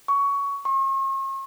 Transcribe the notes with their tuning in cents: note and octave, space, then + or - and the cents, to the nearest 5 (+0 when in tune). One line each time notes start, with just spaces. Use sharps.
C#6 +15
C#6 -45